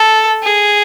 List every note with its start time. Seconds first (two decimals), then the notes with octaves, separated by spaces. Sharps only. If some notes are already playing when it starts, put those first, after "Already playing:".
Already playing: A4
0.44 G#4